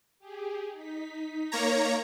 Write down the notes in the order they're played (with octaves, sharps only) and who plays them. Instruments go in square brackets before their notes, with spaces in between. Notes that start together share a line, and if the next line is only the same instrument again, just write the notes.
[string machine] G4 G#4
D#4 B6
[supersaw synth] A#3 C#5 A#5